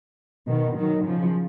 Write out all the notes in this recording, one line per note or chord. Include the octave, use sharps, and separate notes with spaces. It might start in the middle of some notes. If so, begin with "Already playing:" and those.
B2 D#3
D#3 F#3
C#3 F3